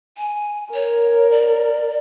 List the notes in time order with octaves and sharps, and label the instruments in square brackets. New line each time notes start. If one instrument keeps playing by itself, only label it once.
[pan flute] G#5
[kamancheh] A#4 [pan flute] C#5
[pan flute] D5